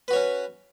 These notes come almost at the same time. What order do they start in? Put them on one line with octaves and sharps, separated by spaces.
B4 F#4 C#5 C#4